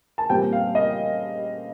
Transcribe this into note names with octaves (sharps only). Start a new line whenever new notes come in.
A5
A#2 G3 C4 G5
F5
D#5